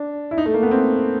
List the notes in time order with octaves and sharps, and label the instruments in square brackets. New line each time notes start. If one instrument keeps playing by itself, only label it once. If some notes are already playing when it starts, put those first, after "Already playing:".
Already playing: [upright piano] D4
E4
D#4
A3
A#3
B3
C4